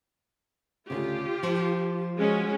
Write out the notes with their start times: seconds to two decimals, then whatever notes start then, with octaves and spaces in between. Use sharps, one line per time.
0.90 D2 A2 C#3 F4 G4
1.43 F3
2.18 G#3 C#4 F#4